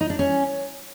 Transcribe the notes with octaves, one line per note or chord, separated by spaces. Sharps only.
D#4
D4
C#4